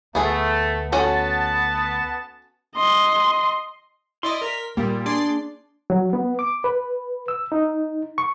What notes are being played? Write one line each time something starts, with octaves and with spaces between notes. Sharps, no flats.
D2 A3 B3 G#4
B3 C#4 F#4 A4 A5
D#5 C6
E4 D5 D#5 C6
A#4 B6
A#2 G3 A#3
D4 G#4 D5 C6
F#3
B3
D6
B4
E6
D#4
C#6